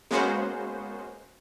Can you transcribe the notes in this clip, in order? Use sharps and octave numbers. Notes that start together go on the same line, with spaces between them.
G#3 A#3 B3 C#4 F#4 C5